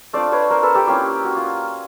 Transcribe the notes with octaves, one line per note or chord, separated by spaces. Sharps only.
A3 D4 F4 C5 D5
B4 C#5
A#4 C5
A4 B4
G4 A4
A#3 C#4 E4 F4 G4
F#4
F4